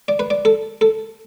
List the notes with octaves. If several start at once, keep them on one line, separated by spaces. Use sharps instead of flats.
D5
B4
D5
A4
A4